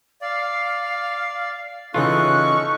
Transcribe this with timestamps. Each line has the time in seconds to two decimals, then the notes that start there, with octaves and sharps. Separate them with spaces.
0.21 D5 F5
1.94 C#3 E3 C#4 D#4 F4 A4 C#6 F#6